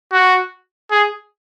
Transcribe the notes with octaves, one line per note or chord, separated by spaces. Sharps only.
F#4
G#4